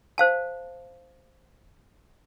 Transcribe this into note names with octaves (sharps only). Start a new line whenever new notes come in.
C5 F5 A5